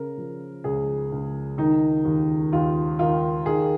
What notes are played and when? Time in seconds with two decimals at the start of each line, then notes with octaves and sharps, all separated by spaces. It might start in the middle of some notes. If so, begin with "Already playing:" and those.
Already playing: C#3 A#4
0.18 F3
0.64 C#2 G#4
1.12 C#2
1.58 D#3 D#4
2.05 D#2
2.52 D#2 F4
2.99 D#3 F4
3.46 D#3 G#4